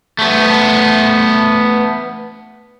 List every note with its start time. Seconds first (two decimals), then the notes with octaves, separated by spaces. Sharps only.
0.19 A3 B3